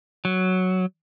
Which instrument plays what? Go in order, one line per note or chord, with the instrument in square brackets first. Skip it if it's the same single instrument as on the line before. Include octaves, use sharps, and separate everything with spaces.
[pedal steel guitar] F#3